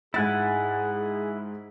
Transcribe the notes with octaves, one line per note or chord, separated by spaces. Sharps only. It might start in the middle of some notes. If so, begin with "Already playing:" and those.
G#2 E4 G#4 F#5 G#5 A6